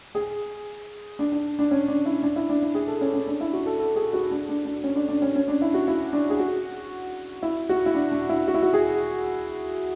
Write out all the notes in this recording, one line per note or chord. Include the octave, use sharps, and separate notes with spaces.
G#4
D4
D4
D4
C#4
D4
E4
D4
E4
D4
E4
G#4
A4
C#4
C#4
D4
E4
F#4
A4
A4
G#4
F#4
D4
D4
D4
C#4
D4
D4
C#4
C#4
D4
E4
F#4
E4
D4
G#4
F#4
E4
F#4
E4
D4
D4
E4
F#4
E4
F#4
G#4